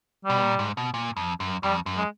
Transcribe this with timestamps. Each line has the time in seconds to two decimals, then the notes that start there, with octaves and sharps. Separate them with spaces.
0.25 B2 G3
0.42 A#2
0.59 G#2
0.77 B2
0.94 A#2
1.17 F2
1.40 F#2
1.63 F2 G3
1.86 F#2
1.97 G#3